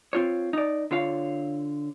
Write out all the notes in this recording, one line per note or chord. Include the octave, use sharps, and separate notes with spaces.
C4 F4 C#5
D#4 D5
D3 F4 C#5 F5